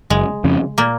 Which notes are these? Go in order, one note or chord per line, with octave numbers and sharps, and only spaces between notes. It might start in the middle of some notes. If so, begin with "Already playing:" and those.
F#1 G#3
F2 C#3
A#2 A#3